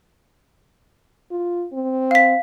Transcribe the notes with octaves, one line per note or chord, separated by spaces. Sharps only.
F4
C4
F5 B6